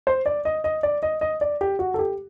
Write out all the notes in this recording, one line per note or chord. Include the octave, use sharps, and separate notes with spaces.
C5
D5
D#5
D#5
D5
D#5
D#5
D5
G4
F#4
A4
G4